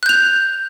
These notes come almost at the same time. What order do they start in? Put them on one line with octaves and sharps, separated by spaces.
F#6 G6 F7